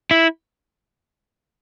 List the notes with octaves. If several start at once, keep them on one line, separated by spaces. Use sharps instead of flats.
E4